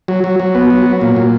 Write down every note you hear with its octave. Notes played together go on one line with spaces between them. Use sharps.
F#3
F#3
F#3
B3
F#3
F#3
A#2
A#2